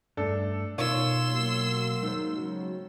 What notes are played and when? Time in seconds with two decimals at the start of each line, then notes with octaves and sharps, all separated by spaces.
0.17 G2 A3 D4 A4
0.78 B2 D#3 F4 C#5 C6 E6
1.31 F#3 A#3
2.02 D#3 G#3 D#4 C5
2.35 C#3 F#3